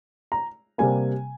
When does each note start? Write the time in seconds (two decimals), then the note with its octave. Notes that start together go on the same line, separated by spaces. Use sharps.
0.32 A#5
0.78 C3 G3 A#3 G#5